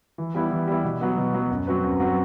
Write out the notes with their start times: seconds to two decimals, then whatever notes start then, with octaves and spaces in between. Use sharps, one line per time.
0.18 E3
0.35 G3 B3 E4
0.51 E3
0.68 G3 B3 E4
0.84 B2
1.01 F#3 B3
1.18 B2
1.34 F#3 B3
1.51 F#2
1.67 F#3 C4 F#4 B4
1.84 F#2
2.00 F#3 C4 F#4 B4